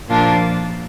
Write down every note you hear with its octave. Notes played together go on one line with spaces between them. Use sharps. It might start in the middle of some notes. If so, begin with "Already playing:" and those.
A#2 F3 A#3 D4 F4